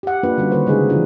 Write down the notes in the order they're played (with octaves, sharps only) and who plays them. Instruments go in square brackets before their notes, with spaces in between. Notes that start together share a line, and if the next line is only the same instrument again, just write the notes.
[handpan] G4 F#5
A#3 D4 F4 B4
D3 G3 C#4 F#4
D3 D#3 A#3 A4 B4 C5
C#3 G#3 D#4 G#4
E3 F3 D4 F4 D5